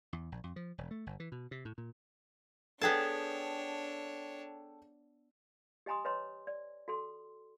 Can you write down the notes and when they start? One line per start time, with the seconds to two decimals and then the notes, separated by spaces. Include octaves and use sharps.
0.13 E2
0.32 A#1
0.44 F2
0.56 F3
0.78 E1
0.91 A3
1.07 G1
1.20 E3
1.32 B2
1.51 C3
1.65 A2
1.78 A#2
2.81 B3 D4 G#4 A4 C#5 G5 A5
5.86 G4 D#5 G#5 A#5 C6 D#6
6.05 B4 C#5 D#5 A#5 C6
6.47 D5
6.88 F#4 A4 C6